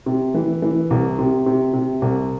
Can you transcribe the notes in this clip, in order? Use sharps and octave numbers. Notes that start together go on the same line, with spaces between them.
C3
E3
E3
C2
C3
C3
C3
C2